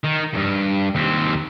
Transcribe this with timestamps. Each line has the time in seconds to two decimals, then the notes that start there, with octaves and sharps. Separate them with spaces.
0.04 D#3
0.33 E2 G2
0.95 D#2 C4